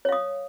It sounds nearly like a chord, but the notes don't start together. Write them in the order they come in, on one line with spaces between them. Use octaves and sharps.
C#5 F5 D#6